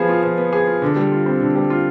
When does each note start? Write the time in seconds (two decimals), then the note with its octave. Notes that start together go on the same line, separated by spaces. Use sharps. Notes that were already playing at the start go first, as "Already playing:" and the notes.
Already playing: F3 B3 G#4
0.09 F4
0.23 F3
0.38 B3
0.53 G#4
0.67 F4
0.82 D3
0.96 G3
1.12 F4
1.26 C4
1.40 D3
1.55 G3
1.70 F4